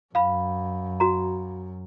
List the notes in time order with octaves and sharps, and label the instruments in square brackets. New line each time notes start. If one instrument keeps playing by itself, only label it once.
[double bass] F#2 [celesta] F5 B5
[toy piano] F#4 A#5